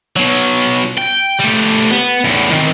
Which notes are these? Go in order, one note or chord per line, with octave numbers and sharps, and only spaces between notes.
B2 F#3
G5
G3 A3
B3
E2 A2
D#3 C4